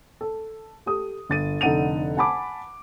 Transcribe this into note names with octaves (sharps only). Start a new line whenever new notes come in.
A4
G4 A4 D#6
G1 A6 D#7
F1 D3 D#4 F#5 D#7 F7
F#5 G#5 A5 B5 D6